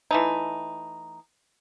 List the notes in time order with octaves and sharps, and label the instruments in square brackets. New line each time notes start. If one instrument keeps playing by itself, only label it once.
[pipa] E3 A3 D#4